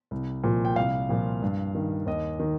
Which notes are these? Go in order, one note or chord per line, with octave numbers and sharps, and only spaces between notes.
C2
A#2 F3
G5
C2 F5
A#2 F3
G2
D#3
D#2 D#5
D#3